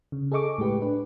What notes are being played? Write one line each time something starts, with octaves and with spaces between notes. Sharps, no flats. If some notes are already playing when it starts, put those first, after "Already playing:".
C#3
G#4 A4 D#5 C#6 D6
A2 G#3 G4 B4
D4 B4